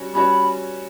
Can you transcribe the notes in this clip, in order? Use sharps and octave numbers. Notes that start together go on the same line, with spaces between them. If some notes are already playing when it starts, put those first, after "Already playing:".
Already playing: G3 C#4 F#4 C#5
G3 C#4 F#4 C#5 B5